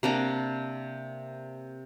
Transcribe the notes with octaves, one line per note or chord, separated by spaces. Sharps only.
C3 A#3 D4 A#5